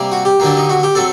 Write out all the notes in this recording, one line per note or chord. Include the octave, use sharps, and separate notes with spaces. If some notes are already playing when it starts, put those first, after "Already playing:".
Already playing: C3 G3 A#3
F#4
G4
D3 F#3 A#3 D4
D#4
F#4
G4
F#3 C4 A4